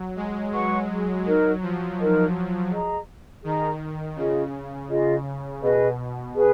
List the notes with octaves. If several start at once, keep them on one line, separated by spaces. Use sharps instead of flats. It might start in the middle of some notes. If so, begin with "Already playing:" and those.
Already playing: F#3
G#3
F#3 B4 F#5 C#6
F#3 D#4 A#4 D#5
F3
D#4 A#4 D#5
G#4 D#5 A#5
D#3 G#4 D#5 A#5
C#3 F4 G#4 D#5
F4 G#4 D#5
B2 G#4 B4 D#5
G#4 B4